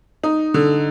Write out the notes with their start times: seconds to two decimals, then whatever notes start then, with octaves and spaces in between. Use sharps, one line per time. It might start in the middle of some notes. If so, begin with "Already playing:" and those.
0.24 D#4
0.54 D3